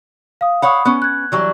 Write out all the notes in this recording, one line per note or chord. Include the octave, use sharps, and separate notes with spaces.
F5 D#6
C#5 F5 F#5 B5 C#6 D#6
B3 C#4
F#6 G#6
E3 F#3 G3